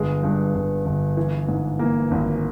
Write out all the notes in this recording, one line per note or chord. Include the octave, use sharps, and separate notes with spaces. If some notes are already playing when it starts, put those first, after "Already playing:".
Already playing: G1 G#3
G2 G#3
G1
G1
E3
G#2
E3 A#3
G#1